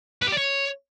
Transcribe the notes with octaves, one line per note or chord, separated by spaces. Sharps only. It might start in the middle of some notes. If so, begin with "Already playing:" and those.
B4
G4
D5
C#5